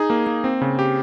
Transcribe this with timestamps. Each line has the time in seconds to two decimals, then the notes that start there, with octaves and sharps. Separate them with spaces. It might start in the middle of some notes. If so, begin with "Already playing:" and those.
Already playing: D#4 G#4
0.10 A#3
0.27 A#3
0.44 C4
0.61 C#3
0.79 G4